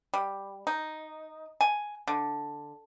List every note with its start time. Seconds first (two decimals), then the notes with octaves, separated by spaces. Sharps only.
0.14 G3
0.67 D#4
1.61 G#5
2.08 D3